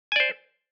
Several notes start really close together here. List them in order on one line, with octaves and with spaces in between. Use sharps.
G#5 D5 C5